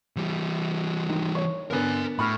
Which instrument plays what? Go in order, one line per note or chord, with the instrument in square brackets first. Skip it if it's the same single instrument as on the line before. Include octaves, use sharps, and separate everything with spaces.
[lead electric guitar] E3 G3
[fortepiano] D#3
C#5
[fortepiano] D3 B3 [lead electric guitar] A#4 G#5
[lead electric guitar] A2 [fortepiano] B5 C#6 F6